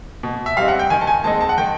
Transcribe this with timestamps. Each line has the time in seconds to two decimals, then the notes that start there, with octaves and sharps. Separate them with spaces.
0.23 B2
0.46 E5
0.57 G3 C4 D#4 F5
0.68 F#5
0.79 G5
0.90 D#3 G#5
1.01 A5
1.07 G#5
1.24 G#3 C4 D#4 A5
1.41 A5
1.49 F#5
1.58 D#3 G5